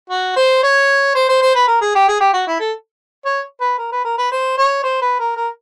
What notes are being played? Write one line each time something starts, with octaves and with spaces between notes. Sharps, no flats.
F#4
C5
C#5
C5
C5
C5
B4
A#4
G#4
G4
G#4
G4
F#4
E4
A4
C#5
B4
A#4
B4
A#4
B4
C5
C#5
C5
B4
A#4
A#4